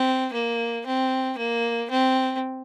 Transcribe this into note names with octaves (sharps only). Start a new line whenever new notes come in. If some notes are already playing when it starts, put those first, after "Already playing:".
Already playing: C4
A#3
C4
A#3
C4